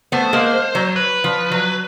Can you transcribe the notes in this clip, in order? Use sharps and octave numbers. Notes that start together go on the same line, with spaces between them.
A3 B3 C5
G#3 A#3
F#3
B4
F3
F#3